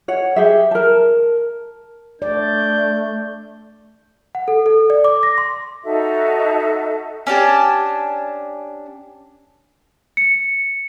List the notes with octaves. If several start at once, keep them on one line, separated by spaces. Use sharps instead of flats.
C#5 F#5
G4 G#4 E5
A#4 A5
A3 D4 D5 G6
F#5
A4
A4
D5
D6
A#6
C6
D#4 F#4 A4 E5
C#4 D4 G4 A5
C#7